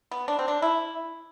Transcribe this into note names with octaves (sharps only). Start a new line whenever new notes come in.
B3
D4
C4
D4
E4